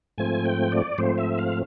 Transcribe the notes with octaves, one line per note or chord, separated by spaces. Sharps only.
G#2 F3 A3 C4 G#5
G5
D5
G#2 F3 A3 C4 C5
E5
F5